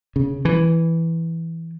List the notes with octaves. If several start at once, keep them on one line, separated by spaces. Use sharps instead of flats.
C#3
E3